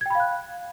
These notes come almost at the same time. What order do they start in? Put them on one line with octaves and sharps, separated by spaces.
G#6 G5 B5 F5 F#6